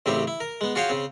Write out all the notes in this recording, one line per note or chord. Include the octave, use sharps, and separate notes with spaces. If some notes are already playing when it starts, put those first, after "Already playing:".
A1 C#3 C4 E4 G4
E4
A#4
G#3 B3
F4 F#4 G#4 C#5 F5 G5
C#3 C4